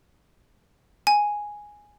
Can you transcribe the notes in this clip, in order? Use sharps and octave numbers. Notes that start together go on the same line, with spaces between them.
G#5